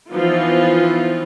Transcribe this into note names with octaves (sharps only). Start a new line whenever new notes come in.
E3 F3 B3 D#4 F4